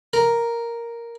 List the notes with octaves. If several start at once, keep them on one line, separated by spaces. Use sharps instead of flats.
A#4